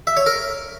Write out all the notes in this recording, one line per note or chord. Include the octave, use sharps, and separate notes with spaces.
E5
C#5
A#4